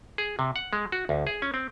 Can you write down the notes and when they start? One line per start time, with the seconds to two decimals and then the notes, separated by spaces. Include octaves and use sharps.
0.18 G#4
0.39 C3
0.56 F#5
0.73 G#3
0.92 F#4
1.09 D2
1.27 G#4
1.42 C#4
1.54 C4